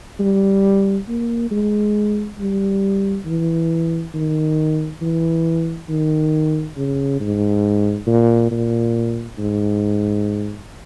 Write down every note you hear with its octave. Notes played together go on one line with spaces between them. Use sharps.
G3
A#3
G#3
G3
E3
D#3
E3
D#3
C#3
G#2
A#2
A#2
G#2